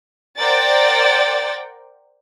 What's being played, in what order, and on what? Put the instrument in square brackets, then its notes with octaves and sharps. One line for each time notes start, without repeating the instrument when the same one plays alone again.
[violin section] A#4 C5 D5 F#5 G5 A6